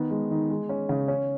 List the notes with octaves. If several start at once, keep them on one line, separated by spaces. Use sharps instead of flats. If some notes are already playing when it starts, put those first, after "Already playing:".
Already playing: D#3 B3
G#3
D#3
G#3
C#4
C#3
C#4